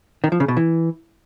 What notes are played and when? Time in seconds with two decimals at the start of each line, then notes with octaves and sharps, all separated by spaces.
0.24 D#3
0.32 F3
0.40 C#3
0.48 B2
0.57 E3